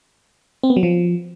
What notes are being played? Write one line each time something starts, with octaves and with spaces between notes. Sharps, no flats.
C4
B3
F#3
F3